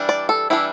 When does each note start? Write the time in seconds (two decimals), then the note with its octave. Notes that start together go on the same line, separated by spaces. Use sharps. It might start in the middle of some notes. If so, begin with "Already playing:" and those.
Already playing: E3 G3 D4
0.09 D5
0.29 A4
0.50 E3 G3 D4 E4